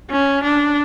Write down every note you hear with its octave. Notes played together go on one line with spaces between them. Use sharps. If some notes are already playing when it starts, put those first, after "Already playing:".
C#4
D4